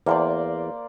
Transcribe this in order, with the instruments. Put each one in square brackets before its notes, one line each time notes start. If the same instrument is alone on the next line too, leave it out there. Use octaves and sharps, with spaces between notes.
[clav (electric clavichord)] E2 [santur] A#3 C5 D5